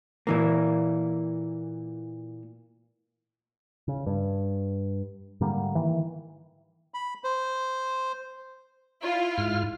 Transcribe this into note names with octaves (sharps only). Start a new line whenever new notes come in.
A#2 E3 A#3
C#3
G2
G#2 D3 G3 A#3
D#3 E3
B5
C5
E4 F4
G#2 F6